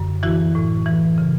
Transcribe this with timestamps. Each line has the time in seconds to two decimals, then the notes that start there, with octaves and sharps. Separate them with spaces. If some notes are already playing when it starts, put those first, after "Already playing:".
Already playing: F#2 D3
0.23 E3 E4 F#4
0.55 A2
0.86 E3
1.18 C#3